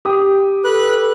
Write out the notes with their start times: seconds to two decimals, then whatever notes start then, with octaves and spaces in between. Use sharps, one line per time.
0.05 G4 D#6
0.64 A4 B4 F#6